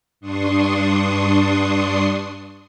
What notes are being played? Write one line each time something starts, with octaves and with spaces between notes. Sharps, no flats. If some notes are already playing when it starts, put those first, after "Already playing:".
G2 D4 C6 C#6 D#6 C7